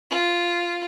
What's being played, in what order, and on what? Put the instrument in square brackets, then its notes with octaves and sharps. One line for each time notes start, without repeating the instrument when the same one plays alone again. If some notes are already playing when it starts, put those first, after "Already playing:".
[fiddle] F4